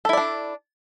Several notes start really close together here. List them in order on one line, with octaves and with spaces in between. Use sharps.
A4 E4 D5 D4